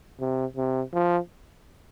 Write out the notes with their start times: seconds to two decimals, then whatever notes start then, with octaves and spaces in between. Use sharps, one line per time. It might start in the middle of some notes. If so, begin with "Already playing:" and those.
0.20 C3
0.56 C3
0.93 F3